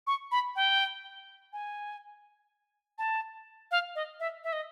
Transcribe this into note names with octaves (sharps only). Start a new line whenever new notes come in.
C#6
B5
G5
G#5
A5
F5
D#5
E5
E5
D#5